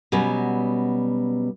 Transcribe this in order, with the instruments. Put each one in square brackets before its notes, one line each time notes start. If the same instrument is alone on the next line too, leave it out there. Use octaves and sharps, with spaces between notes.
[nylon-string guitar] B2 F#3 G3 B3 C#4